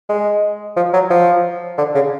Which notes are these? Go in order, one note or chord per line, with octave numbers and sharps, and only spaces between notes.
G#3
F3
F#3
F3
D3
C#3